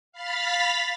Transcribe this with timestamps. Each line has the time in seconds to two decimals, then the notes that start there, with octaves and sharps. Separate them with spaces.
0.12 F5 B5 F6 A6 B6